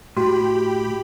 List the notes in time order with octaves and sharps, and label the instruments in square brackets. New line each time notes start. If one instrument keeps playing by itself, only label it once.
[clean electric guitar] A2 [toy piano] F#4 [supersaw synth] G4 B5